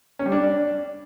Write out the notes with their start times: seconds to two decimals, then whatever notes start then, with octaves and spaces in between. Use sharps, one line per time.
0.19 C#4
0.26 G3
0.32 D4